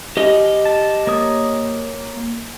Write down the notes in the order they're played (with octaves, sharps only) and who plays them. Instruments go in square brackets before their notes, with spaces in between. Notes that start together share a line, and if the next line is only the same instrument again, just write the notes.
[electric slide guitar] G4 D#5
[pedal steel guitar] A5
A#3 C#5 D#6